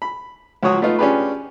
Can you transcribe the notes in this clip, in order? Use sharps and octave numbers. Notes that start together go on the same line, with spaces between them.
B5
C#2 F3 F#3 F#4 C#5 D#6
A3 B3 D#4 F4
C#4 D4 F4 G4 G#4 B4